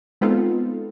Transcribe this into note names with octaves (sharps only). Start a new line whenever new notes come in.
G#3 B3 C4 D#4 F4 A4